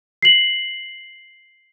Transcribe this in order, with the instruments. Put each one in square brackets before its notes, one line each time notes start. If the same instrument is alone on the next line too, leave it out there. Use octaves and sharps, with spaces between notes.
[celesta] C7 F#7